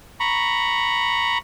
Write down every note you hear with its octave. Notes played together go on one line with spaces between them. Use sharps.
A#5 B5 C#6